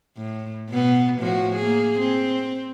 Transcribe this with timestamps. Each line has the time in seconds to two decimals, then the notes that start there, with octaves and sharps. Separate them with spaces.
0.17 A2
0.70 B2 B3
1.20 A2 F3 F#4
1.56 A#3 G#4
1.99 C4